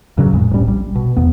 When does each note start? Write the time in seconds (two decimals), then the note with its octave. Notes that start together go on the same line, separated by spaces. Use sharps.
0.18 G2 C#3 F#3
0.34 F2 A2 G#3
0.51 D1 A2 G3 C#4
0.67 A#1 G3
0.95 B2
1.17 E2 B3